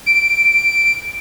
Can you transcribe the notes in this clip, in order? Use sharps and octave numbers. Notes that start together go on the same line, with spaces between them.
D7